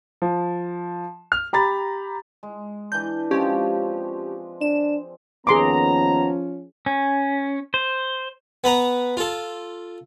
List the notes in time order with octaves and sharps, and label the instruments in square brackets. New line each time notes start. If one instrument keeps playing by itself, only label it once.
[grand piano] F3
F6
G4 A#5 B5 A6
[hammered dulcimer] G#3
[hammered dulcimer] E3 D4 [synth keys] G6
[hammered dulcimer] F3 G#3 C4 [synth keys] C#4 G4
[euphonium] D4 [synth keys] E7
[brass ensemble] D#2 B3 A#5 [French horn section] F3 C#4 [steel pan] G#4 C6 D6
[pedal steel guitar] C#4
C5
[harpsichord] B3 B4 A#5
F4 A4